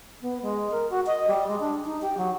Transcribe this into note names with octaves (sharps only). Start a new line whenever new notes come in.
B3
G#3
A#4
F#4
D#5
G3
G#3
D4
D#4
G4
F#3